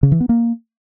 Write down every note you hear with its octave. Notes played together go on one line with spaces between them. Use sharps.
C#3
E3
B3
A#3